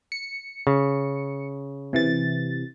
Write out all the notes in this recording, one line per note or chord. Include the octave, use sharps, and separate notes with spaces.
C#7
C#3
C3 E3 A6